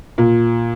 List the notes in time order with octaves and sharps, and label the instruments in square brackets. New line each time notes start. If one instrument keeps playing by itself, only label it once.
[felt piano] A#2